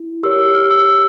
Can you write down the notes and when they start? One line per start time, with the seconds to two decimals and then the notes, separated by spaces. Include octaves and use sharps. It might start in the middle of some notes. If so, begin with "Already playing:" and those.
Already playing: E4
0.23 G4 A#4 C#5 E6
0.39 E6
0.54 F6
0.70 E6
0.86 E6